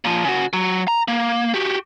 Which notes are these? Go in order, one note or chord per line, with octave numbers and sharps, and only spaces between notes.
A#2 F3
C#3 F#4
F#3
A#5
A#3
F#4 G4